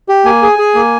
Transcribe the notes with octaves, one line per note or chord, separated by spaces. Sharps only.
G4
A#3 G#5
G#4
G#4
A#3